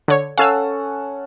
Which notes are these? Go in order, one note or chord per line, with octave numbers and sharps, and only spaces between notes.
D3 C#5
C#4 A4 F5 F#5 G#5 E6